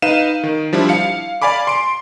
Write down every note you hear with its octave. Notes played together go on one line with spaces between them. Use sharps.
D#4 B4 F5 D#7 E7
D#3
F3 G3 D4 E4
F5 C#7
D5 F5 G#5 B5 D6
C6 D7